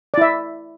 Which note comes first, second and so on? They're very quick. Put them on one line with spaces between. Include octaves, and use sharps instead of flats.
D5 E4 E5